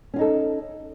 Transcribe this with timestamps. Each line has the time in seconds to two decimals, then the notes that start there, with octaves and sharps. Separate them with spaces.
0.14 C#4
0.16 F4
0.19 D#4
0.21 A4